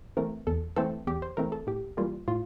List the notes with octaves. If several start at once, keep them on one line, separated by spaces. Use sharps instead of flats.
E3 A3 C4 A#4
E2 A4
E3 A3 C4 A4
E2 G4
C5
E3 A3 C4 A#4
A4
A2 G4
E3 G3 A#3 F4
A2 F4